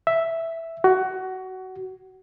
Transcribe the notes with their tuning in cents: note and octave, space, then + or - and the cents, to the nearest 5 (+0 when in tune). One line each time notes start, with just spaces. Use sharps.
E5 +0
F#4 +20